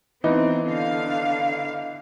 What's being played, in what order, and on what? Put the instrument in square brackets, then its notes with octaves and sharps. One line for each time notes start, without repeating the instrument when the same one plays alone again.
[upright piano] E3 B3 D#4 [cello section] C4
[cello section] D3 F5